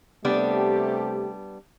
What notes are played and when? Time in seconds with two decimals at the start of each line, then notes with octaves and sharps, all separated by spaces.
0.25 C3 G3 A3 B3 D4 G4